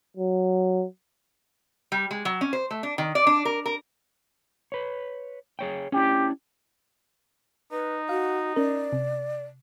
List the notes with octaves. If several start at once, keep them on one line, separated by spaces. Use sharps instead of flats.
F#3
G3
G#3
F#3
C#4
C5
A3
D4
D#3
D5
D4
A#4
A#4
B4 C#5
G#4 C#5 G5
C#4 D4 E4 G4
D#4 B4
F#4 F5
C#4 A#4 D5
C3